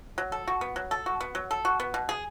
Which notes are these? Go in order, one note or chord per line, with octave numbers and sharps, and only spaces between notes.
F#3
A4
F#4
B3
F#3
A4
F#4
B3
F#3
A4
F#4
B3
B2
G#4